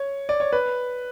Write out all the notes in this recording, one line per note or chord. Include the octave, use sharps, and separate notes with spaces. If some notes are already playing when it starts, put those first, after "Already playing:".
Already playing: C#5
D5
C#5
B4